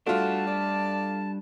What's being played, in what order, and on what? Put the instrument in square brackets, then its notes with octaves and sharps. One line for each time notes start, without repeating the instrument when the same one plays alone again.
[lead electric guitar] G3 D4 [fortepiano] A3 F4 [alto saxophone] F#4 [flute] A5
[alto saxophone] D5